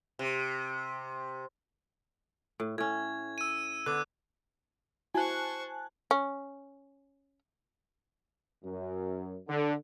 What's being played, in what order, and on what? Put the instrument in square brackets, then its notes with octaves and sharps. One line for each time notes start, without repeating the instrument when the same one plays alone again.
[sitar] C3
[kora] A2
[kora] A2 C#4 [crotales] G#6
[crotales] E6 D#7
[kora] D3 B3 [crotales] D6 F#6
[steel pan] E4 F#4 [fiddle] C5 C#6 [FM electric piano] G#5 A5 F#6
[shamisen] C#4
[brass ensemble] F#2
D3